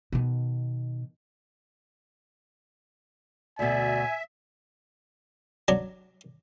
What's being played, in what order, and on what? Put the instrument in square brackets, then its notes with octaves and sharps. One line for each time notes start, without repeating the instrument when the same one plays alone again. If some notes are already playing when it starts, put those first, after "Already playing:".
[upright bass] B2 D#3
[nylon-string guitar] D2 B2 [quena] D5 [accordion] E5 [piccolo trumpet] G#5
[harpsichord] F#3 D4